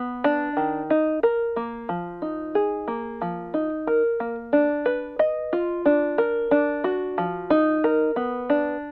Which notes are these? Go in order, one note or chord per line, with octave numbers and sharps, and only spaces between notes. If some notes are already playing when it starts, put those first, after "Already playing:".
Already playing: B3
D4
D#3
D#4
A#4
A#3
F3
D#4
G#4
A#3
F3
D#4
A#4
A#3
D4
B4
D#5
F4
D4
A#4
D4
F#4
F3
D#4
A#4
B3
D4